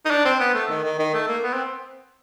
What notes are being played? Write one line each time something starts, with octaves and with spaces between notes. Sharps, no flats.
D#4
D4
C4
B3
A3
D#3
D#3
D#3
A3
A#3
B3
C4